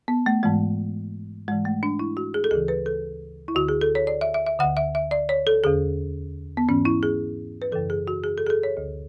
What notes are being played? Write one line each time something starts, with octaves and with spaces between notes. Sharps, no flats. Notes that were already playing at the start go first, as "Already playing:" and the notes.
B3
A3
G#2 E3 G#3
G#2 E3 G#3
A3
D4
E4
F#4
G#4
A4
D2 C#3 E3 G#4
B4
A4
E4
D2 D3 F#4
G#4
A4
C#5
D5
E5
E5
E5
D2 D3 F#5
E5
E5
D5
C#5
A4
E2 D3 G#4
B3
G#2 E3 C#4
E4
G#4
B4
F#2 C#3 E3 A4
G#4
F#4
G#4
A4
G#4
A4
C#5
D2 D3